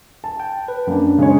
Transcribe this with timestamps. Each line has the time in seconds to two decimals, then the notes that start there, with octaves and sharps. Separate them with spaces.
0.24 A5
0.40 G5
0.68 B4
0.87 F#2 A#3 D4
1.18 C#3 G#3 C#5